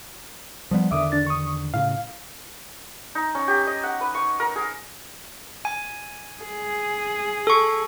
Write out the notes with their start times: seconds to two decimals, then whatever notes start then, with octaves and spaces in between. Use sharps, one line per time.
0.71 F3 G3 B3
0.91 E2 D3 D#3 E5 D6 D#6
1.12 D4 A6
1.27 C#6 D#6
1.74 A2 C#3 F5
3.15 D#4
3.35 C#4
3.48 G4
3.67 D#5
3.83 F#5
4.00 B4
4.14 C#6
4.40 A#4
4.56 G#4
5.65 G#5
6.42 G#4
7.47 A4 C#6